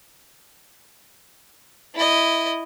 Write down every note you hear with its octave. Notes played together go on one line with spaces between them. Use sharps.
E4 D#5